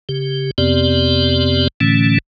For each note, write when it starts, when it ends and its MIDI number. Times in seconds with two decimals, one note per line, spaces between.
0.09 0.51 49
0.09 0.51 67
0.58 1.68 41
0.58 1.68 48
0.58 1.68 59
0.58 1.68 60
0.58 1.68 67
0.58 1.68 74
1.81 2.18 45
1.81 2.18 50
1.81 2.18 52
1.81 2.18 57
1.81 2.18 61